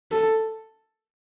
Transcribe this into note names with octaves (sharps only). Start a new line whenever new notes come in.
A4